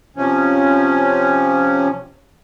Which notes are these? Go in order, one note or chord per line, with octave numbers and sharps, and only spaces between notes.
C3 F3 C#4